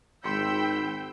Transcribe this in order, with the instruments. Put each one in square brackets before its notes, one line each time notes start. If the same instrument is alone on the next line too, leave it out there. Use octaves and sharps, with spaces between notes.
[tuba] G#1 [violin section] G5 E6 G6 [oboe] B5 [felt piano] C6 C#7